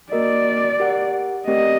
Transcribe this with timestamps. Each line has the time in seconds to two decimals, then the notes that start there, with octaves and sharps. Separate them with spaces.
0.12 A#3 F#4 A#4 D5 D#5
0.80 G4 A#4 F#5
1.47 A3 C4 G4 A#4 D5 D#5